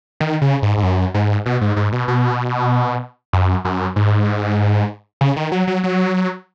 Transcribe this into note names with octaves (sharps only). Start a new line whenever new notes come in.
D#3
C#3
G#2
G#2
F#2
G#2
B2
G#2
G#2
B2
B2
F#2
F#2
G#2
C#3
D#3
F#3
F#3
F#3